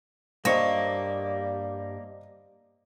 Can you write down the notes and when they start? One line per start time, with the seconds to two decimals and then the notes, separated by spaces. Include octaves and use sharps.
0.45 G2 G3 A#3 C5 C#5 D#5